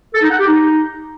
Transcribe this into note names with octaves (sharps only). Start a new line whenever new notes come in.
A4
D#4
F#5
G4
D#4